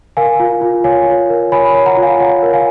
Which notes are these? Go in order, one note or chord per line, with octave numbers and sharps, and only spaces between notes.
A#4 F5 G#5
F4
F4
C#5 F5 G#5
F4
A#4
C#5 G#5 B5
C#5
F#5 A#5
F4
F5 G#5
C#5 F#5
A#4
F5 G#5